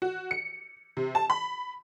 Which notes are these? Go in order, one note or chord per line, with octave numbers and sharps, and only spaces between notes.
F#4
C#7
C3
A5
B5